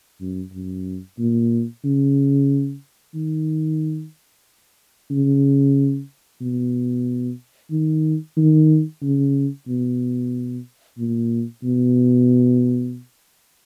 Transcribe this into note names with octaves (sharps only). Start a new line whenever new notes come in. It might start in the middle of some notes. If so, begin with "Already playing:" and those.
F#2
F#2
A#2
C#3
D#3
C#3
B2
D#3
D#3
C#3
B2
A#2
B2